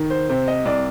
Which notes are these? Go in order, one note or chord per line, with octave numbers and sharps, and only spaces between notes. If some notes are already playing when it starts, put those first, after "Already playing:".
Already playing: D#3
C5
C3 C5
D#5
C2 D5